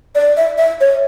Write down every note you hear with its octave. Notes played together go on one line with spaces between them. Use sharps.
D5
E5
E5
C#5